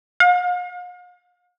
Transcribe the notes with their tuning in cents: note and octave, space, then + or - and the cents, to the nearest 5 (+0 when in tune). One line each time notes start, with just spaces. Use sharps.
F5 +45